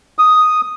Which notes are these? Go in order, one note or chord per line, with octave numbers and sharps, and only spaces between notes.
D#6